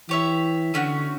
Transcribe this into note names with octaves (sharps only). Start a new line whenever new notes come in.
E3 G4 C#5 E5
D3 A3 C#4 F#4